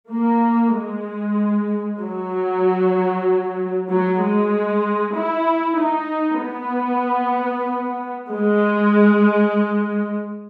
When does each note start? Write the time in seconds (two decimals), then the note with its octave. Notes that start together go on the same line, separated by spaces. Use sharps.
0.11 A#3
0.75 G#3
2.01 F#3
3.90 F#3
4.22 G#3
5.17 E4
5.80 D#4
6.43 B3
8.32 G#3